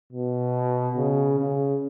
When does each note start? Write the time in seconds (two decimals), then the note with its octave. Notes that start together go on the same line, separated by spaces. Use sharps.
0.13 B2
0.96 C#3
1.39 C#3